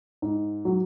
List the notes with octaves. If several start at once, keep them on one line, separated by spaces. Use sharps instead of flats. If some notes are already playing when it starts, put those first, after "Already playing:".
G#2
F#3